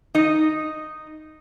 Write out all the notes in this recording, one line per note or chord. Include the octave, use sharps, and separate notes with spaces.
D#4 D#5